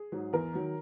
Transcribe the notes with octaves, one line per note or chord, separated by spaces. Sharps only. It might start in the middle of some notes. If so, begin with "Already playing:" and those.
Already playing: G#4
G#2 F#3
E2 A#4
D#3 F#3